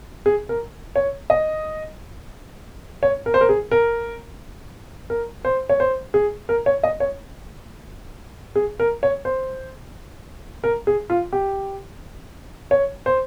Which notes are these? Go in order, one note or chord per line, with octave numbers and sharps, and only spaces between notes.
G#4
A#4
C#5
D#5
C#5
A#4
C5
A#4
G#4
A#4
A#4
C5
C#5
C5
G#4
A#4
C#5
D#5
C#5
G#4
A#4
C#5
C5
A#4
G#4
F4
G4
C#5
C5